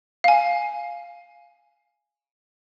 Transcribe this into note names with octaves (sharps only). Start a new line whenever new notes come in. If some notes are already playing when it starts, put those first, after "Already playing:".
F5 G#5